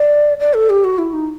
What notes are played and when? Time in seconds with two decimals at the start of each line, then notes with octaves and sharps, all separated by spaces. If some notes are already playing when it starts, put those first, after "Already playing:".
Already playing: D5
0.40 D5
0.54 A4
0.70 G4
0.84 F#4
0.98 E4
1.13 D#4